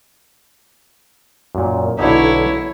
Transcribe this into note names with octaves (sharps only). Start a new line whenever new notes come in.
F#2 A#2
B1 D3 D#4 E4 C#5